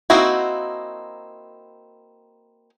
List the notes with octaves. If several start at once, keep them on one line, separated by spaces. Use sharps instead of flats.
A#3 C4 D#4 E4 F#4